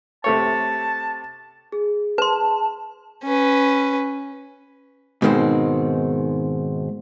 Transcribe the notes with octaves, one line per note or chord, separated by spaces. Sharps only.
C3 A3 C#5 A5
G#4
B4 A5 C6
C#4 B4
G#2 B2 D#3 G#3 C4